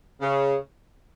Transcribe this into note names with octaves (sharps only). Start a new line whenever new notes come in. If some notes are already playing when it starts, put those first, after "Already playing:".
C#3